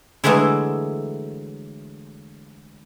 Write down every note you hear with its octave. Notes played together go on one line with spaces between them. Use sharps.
D3 E3 F#3 G#3 A3 E4